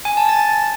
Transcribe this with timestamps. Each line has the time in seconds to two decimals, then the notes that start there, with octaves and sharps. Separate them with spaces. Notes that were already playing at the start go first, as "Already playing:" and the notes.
0.05 G#5
0.17 A5
0.29 A6